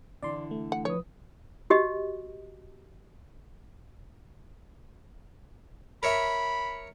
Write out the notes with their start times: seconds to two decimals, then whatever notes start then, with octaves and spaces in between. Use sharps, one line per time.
0.22 D3 E3 D5 C6
0.51 A3
0.72 F#5
0.85 F3 B4 C#5 D#6
1.70 F#4 G4 D#5
6.03 A#4 C#5 E5 B5